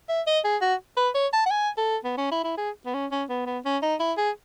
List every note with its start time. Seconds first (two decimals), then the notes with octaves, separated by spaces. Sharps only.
0.09 E5
0.27 D#5
0.44 G#4
0.62 F#4
0.97 B4
1.15 C#5
1.33 A5
1.46 F#5
1.51 G#5
1.78 A4
2.04 B3
2.18 C#4
2.31 E4
2.44 E4
2.57 G#4
2.86 B3
2.94 C#4
3.12 C#4
3.29 B3
3.46 B3
3.65 C#4
3.83 D#4
4.00 E4
4.18 G#4